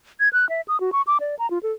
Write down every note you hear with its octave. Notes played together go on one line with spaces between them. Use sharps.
G#6
F#6
E5
D#6
F#4
C#6
D6
D5
A#5
F4
A4